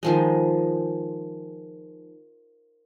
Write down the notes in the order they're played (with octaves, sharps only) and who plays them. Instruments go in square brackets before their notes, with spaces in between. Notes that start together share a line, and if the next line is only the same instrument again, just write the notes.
[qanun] D#3 F3 G#3